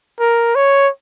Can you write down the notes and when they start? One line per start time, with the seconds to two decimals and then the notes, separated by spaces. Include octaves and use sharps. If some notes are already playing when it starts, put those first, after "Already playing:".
0.20 A#4
0.56 C#5